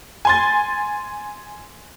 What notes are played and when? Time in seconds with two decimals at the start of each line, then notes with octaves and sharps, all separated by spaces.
0.25 G#5 C6 A6